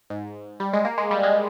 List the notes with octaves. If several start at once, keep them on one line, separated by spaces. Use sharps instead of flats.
G#2
G3
G#3
A#3
G#3
G3
G#3